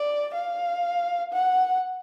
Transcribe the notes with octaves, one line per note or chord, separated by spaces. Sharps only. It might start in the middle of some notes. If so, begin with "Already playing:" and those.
Already playing: D5
F5
F#5